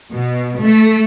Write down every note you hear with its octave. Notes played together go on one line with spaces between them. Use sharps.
B2
A3